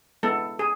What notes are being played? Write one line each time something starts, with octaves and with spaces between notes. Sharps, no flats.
G#3 B3 E4 A4
G#4